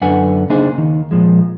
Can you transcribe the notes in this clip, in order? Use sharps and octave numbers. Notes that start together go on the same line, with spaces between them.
F#2 D3 B4 F#5 G#5
C#3 A#3 D4 D#4 G#4 C5
D#2 D#3
A#2 F3 G#3